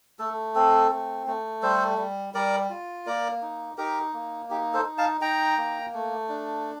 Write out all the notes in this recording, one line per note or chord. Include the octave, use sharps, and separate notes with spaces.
A3 A4
C4 A4
A3
A3
G3 A4 C5
G3
G3 A#4 D5
F4
A#3 A#4 D5
D#4
D#4 G4 A#4
A#3
D#4 G4
A4 C5
D#4
F5 A5
D#4 G5 A#5
A#3
A3
D4